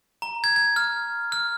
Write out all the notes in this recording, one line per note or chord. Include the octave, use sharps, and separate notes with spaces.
A#5
G#6
G#6
F6
F6